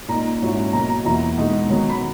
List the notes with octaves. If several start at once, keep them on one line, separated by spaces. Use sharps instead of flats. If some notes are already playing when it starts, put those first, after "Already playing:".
A#2 A#3 D#4 A#5
G#2 F#3 C#4 E4
B2 F#3 A#3 A#5
A#5
E2 B2 A#3 E4 A#5
B2 G#3 B3 D#4
D#3 F#3 B3
B5